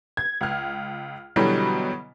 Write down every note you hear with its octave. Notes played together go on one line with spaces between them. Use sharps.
G#6
C#2 F6
B2 D3 E3 F#3 G3